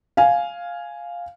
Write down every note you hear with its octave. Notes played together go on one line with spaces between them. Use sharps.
F5 G#5